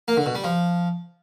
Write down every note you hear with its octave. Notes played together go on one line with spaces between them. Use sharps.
A#3
D3
B2
G3
F3